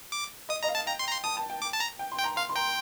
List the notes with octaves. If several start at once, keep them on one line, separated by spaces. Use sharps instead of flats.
D6
D#5 D#6
D#5 A#5
F5
A5
G5 A#5
C6
A#5
C6
A5 D#6
A5
G5
D6
A5
A#5
G5
C6
G5
A#5
F5 C6
C6
G5 A#5